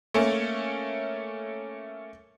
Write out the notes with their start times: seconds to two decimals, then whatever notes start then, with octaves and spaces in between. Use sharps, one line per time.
0.14 A3 A#3 C#4